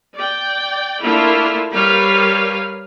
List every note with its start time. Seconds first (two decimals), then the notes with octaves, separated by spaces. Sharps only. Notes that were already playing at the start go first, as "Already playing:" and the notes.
0.14 D5 G5
1.02 A3 A#3 D4 E4 F4
1.71 G3 A#4 B4 C#5 F5